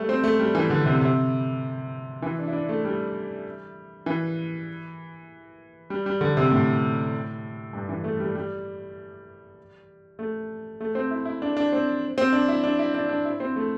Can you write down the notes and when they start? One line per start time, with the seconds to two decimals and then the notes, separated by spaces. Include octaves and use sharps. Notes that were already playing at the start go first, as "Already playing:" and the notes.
Already playing: G3 A3
0.09 C4
0.24 A3
0.39 G3
0.55 E3
0.70 D3
0.86 C3
1.01 C3
2.22 E3
2.39 D4
2.48 E4
2.53 D4
2.69 A3
2.85 G3
4.06 E3
5.90 G3
6.06 G3
6.21 D3
6.37 C3
6.51 A2
7.73 G2
7.89 E3
8.04 A3
8.20 G3
8.35 G3
10.19 A3
10.80 A3
10.95 C4
11.11 E4
11.25 E4
11.42 D4
11.57 D4
11.73 C4
12.18 C4
12.33 D4
12.49 E4
12.64 D4
12.79 E4
12.94 D4
13.09 D4
13.25 E4
13.40 C4
13.56 A3